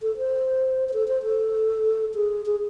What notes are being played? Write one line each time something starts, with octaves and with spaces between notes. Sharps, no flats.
A4
C5
C5
A4
C5
A4
G#4
G#4